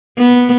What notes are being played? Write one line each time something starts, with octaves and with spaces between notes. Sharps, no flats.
B3